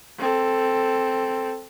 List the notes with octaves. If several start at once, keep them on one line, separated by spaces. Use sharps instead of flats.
C4 A4